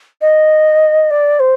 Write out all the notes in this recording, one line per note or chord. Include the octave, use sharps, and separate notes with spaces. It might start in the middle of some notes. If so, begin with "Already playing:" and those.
D#5
D5
C5